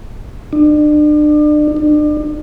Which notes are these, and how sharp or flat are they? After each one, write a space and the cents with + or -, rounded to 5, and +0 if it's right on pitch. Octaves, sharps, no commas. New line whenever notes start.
D4 +35
D4 +35